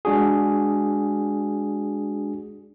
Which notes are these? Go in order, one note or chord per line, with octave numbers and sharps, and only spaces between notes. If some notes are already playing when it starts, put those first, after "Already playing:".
G#3 D4 F#4 G#4